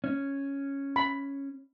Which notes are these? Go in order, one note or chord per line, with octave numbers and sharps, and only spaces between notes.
C#4
B5